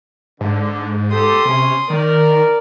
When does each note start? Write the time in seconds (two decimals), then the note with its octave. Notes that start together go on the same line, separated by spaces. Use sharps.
0.41 G#2 D3
1.11 G4 A4 C6 D#6
1.45 C3 C#4
1.90 D#3 A#4 D5